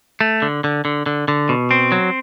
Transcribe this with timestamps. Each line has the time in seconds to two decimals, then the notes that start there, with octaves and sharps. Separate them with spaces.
0.21 A3
0.42 D3
0.64 D3
0.85 D3
1.06 D3
1.28 D3
1.49 B2
1.71 C4
1.92 F#3